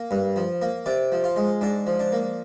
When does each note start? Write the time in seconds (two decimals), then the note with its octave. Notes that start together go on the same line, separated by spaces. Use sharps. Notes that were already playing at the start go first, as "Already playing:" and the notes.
Already playing: A#3
0.11 G2
0.36 F3
0.62 A#3
0.86 C3 D5
1.12 F3
1.24 F4
1.36 G#3
1.61 G#2 D4
1.87 F3
1.99 D4
2.12 A#3